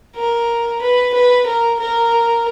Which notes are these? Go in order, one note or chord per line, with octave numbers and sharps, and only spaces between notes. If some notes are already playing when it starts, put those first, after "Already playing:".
A#4
B4
B4
A#4
A#4